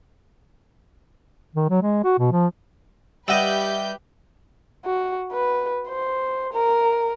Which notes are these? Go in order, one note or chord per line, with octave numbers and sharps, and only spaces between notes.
D#3
F#3
G#3
F#4
B2
F3
G3 G4 B4 D#5 E5 F#5 E6 G6
F#4
B4
C5
A#4